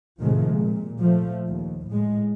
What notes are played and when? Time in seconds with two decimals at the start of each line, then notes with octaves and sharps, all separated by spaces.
0.20 A2 C3 D#3 F3 G#3 A3
0.49 A#2
1.00 F3 A3
1.47 D#2
1.89 A2 G#3